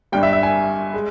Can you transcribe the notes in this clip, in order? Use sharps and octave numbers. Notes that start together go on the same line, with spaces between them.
G1 G2 G3 G5
E5
E5
G#5
G#3